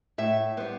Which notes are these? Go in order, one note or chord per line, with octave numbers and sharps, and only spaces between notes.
A2 E5
G3 B3 C5